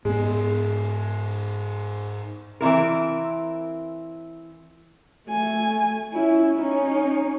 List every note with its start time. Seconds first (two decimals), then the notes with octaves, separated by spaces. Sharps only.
0.05 G#2 G#3 B3
2.61 E3 C4 E4 A#4
5.28 A3 G#5
6.13 C#4 E4
6.58 C#4 D#4